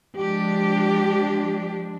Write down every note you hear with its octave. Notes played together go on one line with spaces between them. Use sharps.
F3 G#3 D4 G4